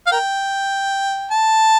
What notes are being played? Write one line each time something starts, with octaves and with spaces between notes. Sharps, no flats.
F5
A#4 G5
A5